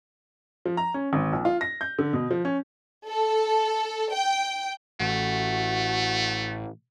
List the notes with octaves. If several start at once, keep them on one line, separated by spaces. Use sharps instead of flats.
F3
A#5
C#4
G#1
A#1
F4
A#6
G6
D3
B2
F3
C#4
A4
G5
A1 A3 F#4